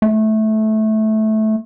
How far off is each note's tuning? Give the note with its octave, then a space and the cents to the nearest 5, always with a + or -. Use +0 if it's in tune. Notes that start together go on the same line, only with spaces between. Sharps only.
A3 -15